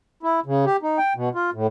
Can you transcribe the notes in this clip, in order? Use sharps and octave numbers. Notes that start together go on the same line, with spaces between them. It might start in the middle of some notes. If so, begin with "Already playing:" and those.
E4
C#3
G4
D#4
G5
B2
F4
A2